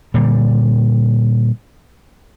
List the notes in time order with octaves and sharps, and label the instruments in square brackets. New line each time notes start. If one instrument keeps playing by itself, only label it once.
[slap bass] A#2 D3 G3